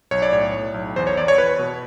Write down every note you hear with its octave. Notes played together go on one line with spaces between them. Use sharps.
B1 C#5
D5
A2 C#5
A2
B1
E2 C5
C#5
E2 D5
C#5
E2 B4
B2